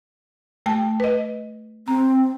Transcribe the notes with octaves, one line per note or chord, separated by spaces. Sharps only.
A3 G5 A5
B4 D#5
C4 A#5